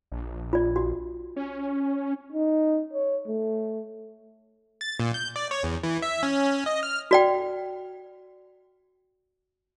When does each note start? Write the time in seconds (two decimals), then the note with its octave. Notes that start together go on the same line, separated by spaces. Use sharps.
0.12 A#1
0.53 F4 D5
0.76 F#4
1.36 C#4
2.32 D#4
2.93 C#5
3.28 A3
4.81 A6
5.00 A#2
5.14 G6
5.36 D5
5.51 C#5
5.63 E2
5.83 E3
6.02 E5
6.23 C#4
6.51 C#4
6.66 D#5
6.83 F6
7.11 F#4 D5 G5